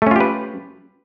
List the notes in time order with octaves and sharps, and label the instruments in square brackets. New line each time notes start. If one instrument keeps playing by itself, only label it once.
[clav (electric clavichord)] A3
C#4
F4
G4
B4